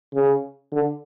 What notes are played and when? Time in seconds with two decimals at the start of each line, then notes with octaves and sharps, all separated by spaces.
0.14 C#3
0.72 D3